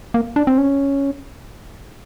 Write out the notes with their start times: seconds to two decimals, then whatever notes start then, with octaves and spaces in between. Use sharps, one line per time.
0.14 A#3
0.36 D4
0.47 C4
0.58 C#4